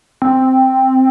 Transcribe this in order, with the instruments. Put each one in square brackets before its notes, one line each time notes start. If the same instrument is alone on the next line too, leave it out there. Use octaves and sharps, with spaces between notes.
[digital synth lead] C4